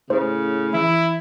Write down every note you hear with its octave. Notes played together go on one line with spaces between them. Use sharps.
A2 C#3 C5
E3 E4